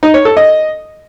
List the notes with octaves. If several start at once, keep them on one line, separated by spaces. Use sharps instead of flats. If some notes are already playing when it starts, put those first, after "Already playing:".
D#4
C#5
A4
D#5